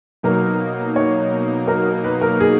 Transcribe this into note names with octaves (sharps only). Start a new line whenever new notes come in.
B2 F#3 A#3 D#4 A#4
C#5
A#4
B4
A#4
G#4